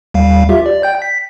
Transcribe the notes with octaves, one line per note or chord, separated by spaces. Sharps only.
D#2 G3 F5
F4 G4 E5
D5
G5 G6
B6